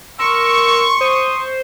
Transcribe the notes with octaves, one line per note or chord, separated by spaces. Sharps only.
A#4 C6 C#6 E6
C5 D#6